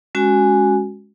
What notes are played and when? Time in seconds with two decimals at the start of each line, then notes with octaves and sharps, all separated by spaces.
0.15 G#3 C#4 F#4 G#5